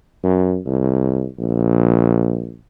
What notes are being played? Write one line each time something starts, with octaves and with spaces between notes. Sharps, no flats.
F#2
C2
A#1